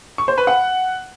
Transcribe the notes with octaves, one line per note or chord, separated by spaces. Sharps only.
C#6
C5
B4
F#5